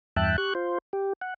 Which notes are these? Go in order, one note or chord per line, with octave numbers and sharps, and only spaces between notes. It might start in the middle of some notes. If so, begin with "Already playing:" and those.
E2 G2 E5 G5 A5 F#6
G4 C#6 F#6
F4 C5
G4
F#5